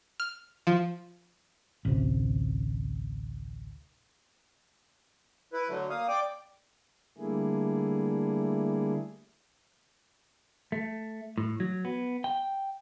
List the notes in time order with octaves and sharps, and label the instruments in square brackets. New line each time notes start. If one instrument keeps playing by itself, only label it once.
[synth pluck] F6
F3
[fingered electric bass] A1 D2 C3
[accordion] E4 B4
D3 F#3 A3
A#3 F5 D#6
D5 G5 D6
[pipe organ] D3 G3 A3 A#3 E4 G#4
[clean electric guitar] A3
A2
F#3
B3
G5